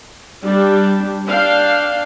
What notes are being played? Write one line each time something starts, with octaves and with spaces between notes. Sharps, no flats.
G3 D4 G4
D4 F5 G5